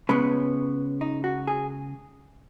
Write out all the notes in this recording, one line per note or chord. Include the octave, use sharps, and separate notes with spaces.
C#2 C#3 G#3 B3 B4
D#4
F#4
G#4